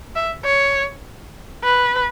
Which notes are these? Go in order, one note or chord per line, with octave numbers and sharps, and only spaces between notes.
E5
C#5
B4